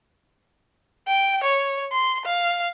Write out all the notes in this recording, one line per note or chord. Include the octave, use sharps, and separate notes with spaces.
G5
C#5
C6
F5